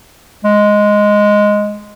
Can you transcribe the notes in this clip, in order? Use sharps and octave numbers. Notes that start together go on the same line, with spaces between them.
G#3